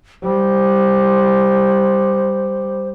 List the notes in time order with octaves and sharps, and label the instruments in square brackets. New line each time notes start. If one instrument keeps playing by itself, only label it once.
[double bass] G3 [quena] C5